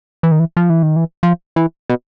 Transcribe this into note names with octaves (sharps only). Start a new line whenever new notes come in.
E3
D#3
E3
F3
E3
D#3
E3
F3
E3
B2